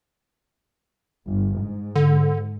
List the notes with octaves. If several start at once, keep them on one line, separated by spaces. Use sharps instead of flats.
G1
G#2
D3